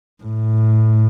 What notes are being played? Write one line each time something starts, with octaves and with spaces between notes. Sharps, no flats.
A2